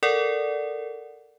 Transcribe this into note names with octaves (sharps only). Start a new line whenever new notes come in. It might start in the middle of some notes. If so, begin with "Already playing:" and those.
A4 A#4 D5 F#5